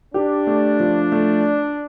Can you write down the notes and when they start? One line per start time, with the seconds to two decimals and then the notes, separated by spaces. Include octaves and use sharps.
0.14 D4 G4
0.47 A3
0.80 F3
1.12 A3